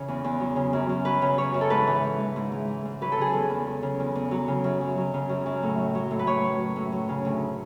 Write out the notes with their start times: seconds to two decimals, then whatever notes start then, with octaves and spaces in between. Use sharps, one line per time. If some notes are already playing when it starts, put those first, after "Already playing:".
Already playing: C#3 E3 C#5
0.08 E2
0.24 E2
0.40 F#3
0.56 C#3
0.73 F#2
0.89 F#2
1.05 F#3 B4
1.22 C#3
1.38 F#2 C#5
1.54 F#2
1.61 A4
1.70 G#2 B4
1.87 E3
2.04 E3
2.20 G#2
2.36 G#2
2.52 E3
2.69 E3
2.85 G#2
3.01 F#3 B4
3.12 A4
3.17 C#3 G#4
3.32 E2 A4
3.50 E2
3.66 F#3
3.83 C#3
4.00 E2
4.15 E2
4.31 F#3
4.48 C#3
4.64 F#2
4.81 F#2
4.98 F#3
5.14 C#3
5.29 F#2
5.46 F#2
5.63 A2
5.79 F#3
5.95 F#3
6.11 A2
6.19 B4
6.27 A2 C#5
6.44 F#3
6.60 F#3
6.76 A2
6.92 F#3
7.09 C#3
7.25 D2